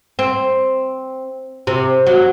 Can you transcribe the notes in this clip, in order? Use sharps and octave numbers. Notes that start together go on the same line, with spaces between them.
C4
C3
F#3